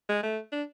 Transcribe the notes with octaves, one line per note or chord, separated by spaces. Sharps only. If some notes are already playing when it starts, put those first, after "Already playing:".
G#3
A3
D4